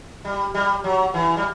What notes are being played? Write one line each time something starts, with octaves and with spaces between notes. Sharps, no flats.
G3
G3
F#3
E3
G3